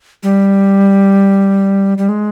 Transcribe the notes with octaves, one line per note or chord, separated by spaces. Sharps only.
G3
G3
G#3